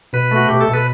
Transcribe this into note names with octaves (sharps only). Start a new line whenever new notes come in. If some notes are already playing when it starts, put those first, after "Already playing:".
B2 B4
A3 F#4
B2 G4
A4
B2
B4